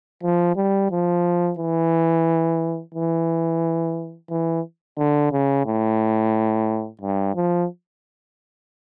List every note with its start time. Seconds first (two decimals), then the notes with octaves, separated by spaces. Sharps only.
0.23 F3
0.56 G3
0.91 F3
1.58 E3
2.94 E3
4.30 E3
4.98 D3
5.31 C#3
5.66 A2
7.01 G2
7.35 F3